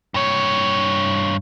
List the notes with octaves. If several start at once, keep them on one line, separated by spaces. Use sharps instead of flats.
G2 C#5